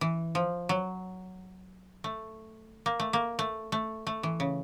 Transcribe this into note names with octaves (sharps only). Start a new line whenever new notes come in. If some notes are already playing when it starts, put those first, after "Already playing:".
E3
F3
F#3
A3
A#3
A3
A#3
A3
A3
A3
E3
C#3